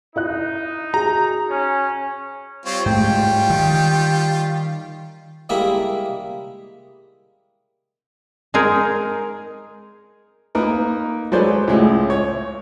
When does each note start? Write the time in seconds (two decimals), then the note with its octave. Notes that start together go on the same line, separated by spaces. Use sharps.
0.16 D#4 E4 D#5 F#6
0.94 F#4 G#4 A#5
1.50 C#4
2.66 G3 C4 F4 C#5
2.86 G#2 G3 A3 F4 G5
3.50 D#3
5.49 G3 G#3 A#3 E4 B5
8.54 G#3 D#4 G#4 A#4
10.55 A#3 D#4 A#4 B4
11.32 F#3 G#3 A4 B4 C5 D5
11.68 C#2 A2 G#3 A3
12.10 C#5